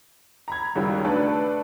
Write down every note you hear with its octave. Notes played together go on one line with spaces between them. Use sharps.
A#5 B5 G#6
C#2 F#2 D#3 F#3 G3
A3 D4 A4 B4 D5